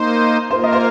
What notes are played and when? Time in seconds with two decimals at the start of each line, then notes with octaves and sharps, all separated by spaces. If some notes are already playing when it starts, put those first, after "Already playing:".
Already playing: A#3 D#4 C5
0.50 A#3 F4 A#4 C5
0.63 D#5
0.73 C5